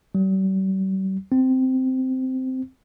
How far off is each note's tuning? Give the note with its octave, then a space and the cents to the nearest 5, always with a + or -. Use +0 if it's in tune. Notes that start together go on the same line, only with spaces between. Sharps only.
G3 -45
C4 -10